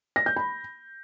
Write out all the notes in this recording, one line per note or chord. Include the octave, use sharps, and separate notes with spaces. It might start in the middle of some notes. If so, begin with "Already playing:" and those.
A#6
G6
B5